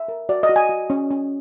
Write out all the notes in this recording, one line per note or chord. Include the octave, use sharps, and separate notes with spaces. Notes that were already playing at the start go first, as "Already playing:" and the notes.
Already playing: E5
A#4
F#4 D5
D#5
F#4
G#5
F#4
C#4
C#4